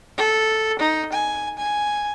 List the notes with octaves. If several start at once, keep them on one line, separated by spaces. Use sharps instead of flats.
A4
D#4
G#5
G#5